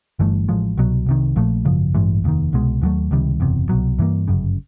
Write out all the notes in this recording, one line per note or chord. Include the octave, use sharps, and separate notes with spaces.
G1 G2 E3 A3
A1 A2 F3 G#3
C2 B2 F#3
C2 C3 D#3
A#1 A#2 F3 A3
G#1 F#2 C#3 F3
A1 G2 E3 G#3
F1 D#2 D#3
C2 B2 G#3
D#2 D#3 F#3 A3
C#2 C3 D#3 G3
F#1 E2 C3
C2 B2 F#3
G2 E3 G3 A#3
G1 F#2 C#3